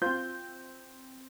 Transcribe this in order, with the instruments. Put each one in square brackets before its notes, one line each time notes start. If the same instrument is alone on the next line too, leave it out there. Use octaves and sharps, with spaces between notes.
[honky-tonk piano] C4 G6 [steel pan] F4 C5